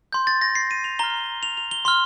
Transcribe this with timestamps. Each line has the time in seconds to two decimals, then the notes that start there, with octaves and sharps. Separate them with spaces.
0.13 C6 G6
0.27 A6
0.42 A#6
0.55 C7
0.71 D#7
0.84 F7
0.99 A#5 F6 G7
1.43 F7
1.57 F7
1.71 G7
1.85 C6 F6 G7